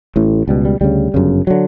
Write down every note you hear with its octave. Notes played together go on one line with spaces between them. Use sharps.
A1 A2
C#2 B2 G3
G3
D2 C#3 G3
G1 F#2 C#3
D3 F#3